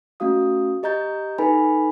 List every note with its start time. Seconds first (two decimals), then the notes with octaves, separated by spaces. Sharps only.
0.20 A3 C#4 F#4 F5 D#6
0.83 G4 D#5 A#5 G6 A6
1.38 D#4 A4 B4 G#5 B5